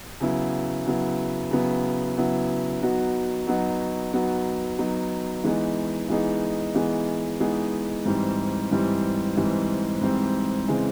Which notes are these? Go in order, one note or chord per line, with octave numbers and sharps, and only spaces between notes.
C#3 F#3 B3 E4
C#3 F#3 B3 E4
C#3 F#3 B3 E4
C#3 F#3 B3 E4
F#3 B3 D#4 F#4
F#3 B3 D#4 F#4
F#3 B3 D#4 F#4
F#3 B3 D#4 F#4
E3 G#3 B3 D#4 G#4
E3 G#3 B3 D#4 G#4
E3 G#3 B3 D#4 G#4
E3 G#3 B3 D#4 G#4
G#2 E3 G3 C4
G#2 E3 G3 C4
G#2 E3 G3 C4
G#2 E3 G3 C4
C#3 E3 G#3 C4